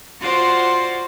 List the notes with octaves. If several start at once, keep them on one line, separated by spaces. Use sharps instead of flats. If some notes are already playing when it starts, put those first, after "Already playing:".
F4 F#4 C5 D5 F#5